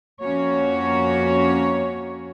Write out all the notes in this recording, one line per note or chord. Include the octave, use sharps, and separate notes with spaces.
F2 A#3 C#4 F#4 C#5